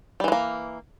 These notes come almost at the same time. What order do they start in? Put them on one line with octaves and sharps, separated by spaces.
G3 E3 G#3 A#3